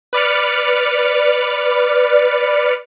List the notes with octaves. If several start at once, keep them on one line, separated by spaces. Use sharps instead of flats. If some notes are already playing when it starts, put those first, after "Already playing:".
B4 D5 F6 C#7